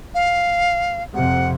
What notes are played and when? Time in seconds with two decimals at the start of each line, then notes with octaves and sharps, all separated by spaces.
0.15 F5
1.14 F2 C3 F#5